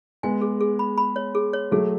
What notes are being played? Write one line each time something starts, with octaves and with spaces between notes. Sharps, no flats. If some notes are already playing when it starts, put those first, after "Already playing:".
G#3 B3 G#5
G#4
G#4
B5
B5
C#5
G#4
C#5
F#3 A3 G#4